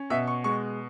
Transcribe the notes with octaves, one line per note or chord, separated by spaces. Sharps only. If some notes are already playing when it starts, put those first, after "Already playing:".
Already playing: C#4
B2 E5
C#6
G#3 C#6